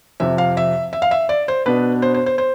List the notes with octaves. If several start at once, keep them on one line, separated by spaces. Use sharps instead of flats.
F2 C3 F3 E5
F5
E5
E5
F5
E5
D5
C5
B2 B3 D4 B4
C5
C5
C5
C5